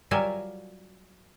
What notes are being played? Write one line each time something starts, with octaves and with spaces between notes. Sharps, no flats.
F#3 G3 F4 A#4 E5 G#5